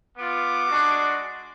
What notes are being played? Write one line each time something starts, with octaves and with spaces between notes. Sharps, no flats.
B3 F4 D6
G#3 D4 F#4